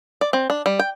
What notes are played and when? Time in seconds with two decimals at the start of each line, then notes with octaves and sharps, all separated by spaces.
0.21 D5
0.33 C4
0.50 D4
0.66 G3
0.80 G5